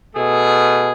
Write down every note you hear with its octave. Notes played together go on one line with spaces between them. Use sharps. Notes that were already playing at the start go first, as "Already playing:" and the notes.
B2 A3 G#4